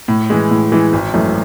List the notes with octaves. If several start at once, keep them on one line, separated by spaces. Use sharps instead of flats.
A2
E3 G#3
A2
E3 G#3
G#1
F#2 E3 A3